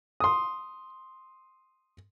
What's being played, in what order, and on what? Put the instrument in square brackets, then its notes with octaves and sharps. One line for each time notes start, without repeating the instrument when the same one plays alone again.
[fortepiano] C6 D#6